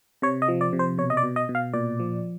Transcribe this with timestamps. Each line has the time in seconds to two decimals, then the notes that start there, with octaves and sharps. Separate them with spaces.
0.22 C3 C#5
0.42 D#5
0.48 F3
0.61 D5
0.73 C3
0.79 C5
0.98 B2 C#5
1.10 D#5
1.17 D5
1.23 B2
1.36 D#5
1.49 B2
1.55 F5
1.73 A#2 D5
1.99 F3